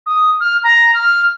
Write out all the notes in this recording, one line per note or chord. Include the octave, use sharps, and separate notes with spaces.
D#6
F6
A#5
F6